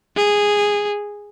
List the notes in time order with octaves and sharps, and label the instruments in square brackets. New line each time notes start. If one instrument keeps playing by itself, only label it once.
[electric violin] G#4